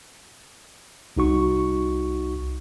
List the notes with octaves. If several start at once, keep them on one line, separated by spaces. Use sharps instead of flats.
C2 D#4 F#4 C#6